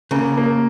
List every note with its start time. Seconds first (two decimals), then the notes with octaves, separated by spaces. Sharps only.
0.11 C#3 A#3
0.37 A#3